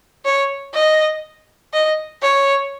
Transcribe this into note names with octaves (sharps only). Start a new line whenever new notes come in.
C#5
D#5
D#5
C#5